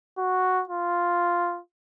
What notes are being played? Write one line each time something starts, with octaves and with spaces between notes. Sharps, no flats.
F#4
F4